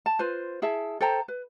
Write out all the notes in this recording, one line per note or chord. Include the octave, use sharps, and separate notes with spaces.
A5
F4 B4 C5
E4 G#4 E5 A5
A4 C5 G5 A#5
B4